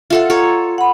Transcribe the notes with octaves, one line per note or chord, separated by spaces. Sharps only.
F4 A4 E5 F#5
F4 A4 C#5 A#5
F#5 B5